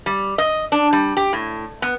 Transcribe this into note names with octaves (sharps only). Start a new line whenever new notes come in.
G3
D#5
D4
G3
G4
A2
B3